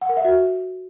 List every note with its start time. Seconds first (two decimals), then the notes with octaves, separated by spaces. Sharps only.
0.01 F#5
0.09 A#4
0.17 E5
0.25 F#4